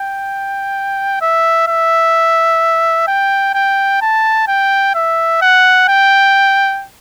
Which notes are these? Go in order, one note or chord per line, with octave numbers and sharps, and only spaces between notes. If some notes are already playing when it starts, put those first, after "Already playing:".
Already playing: G5
E5
E5
G5
G5
A5
G5
E5
F#5
G5